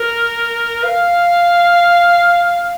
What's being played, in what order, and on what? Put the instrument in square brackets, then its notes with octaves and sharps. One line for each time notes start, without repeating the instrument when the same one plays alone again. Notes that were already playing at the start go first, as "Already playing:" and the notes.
Already playing: [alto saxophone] A#4
F5